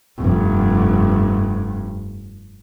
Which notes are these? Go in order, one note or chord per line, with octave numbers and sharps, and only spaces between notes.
F1 G2